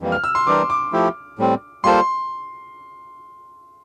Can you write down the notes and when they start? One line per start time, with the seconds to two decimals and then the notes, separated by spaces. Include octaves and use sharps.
0.01 F2 E3 G3 A#3
0.12 F6
0.24 E6
0.35 C6
0.47 E3 G3 D4 G4 A#4 D6
0.70 D6
0.93 F3 A3 E4 G4
1.38 A2 G3 C4
1.84 G3 A#3 F4 A4 C5 C6